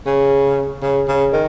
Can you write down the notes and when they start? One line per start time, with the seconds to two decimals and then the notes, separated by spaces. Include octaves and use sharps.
0.06 C#3
0.82 C#3
1.08 C#3
1.33 D#3